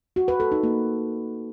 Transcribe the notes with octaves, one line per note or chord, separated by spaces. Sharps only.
F#4
B4
A4
D#4
A#3